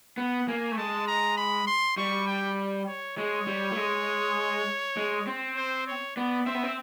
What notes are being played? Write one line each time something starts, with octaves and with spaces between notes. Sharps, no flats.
B3 F#5
A#3 G#5
A3
G#3 A5
A#5
B5
C6
G3 C#6
G5
C#5
G#3 C#5
G3
A3
G#3
G#3
C4
C5
C#5
B3 D5
C4 E5
B3
C4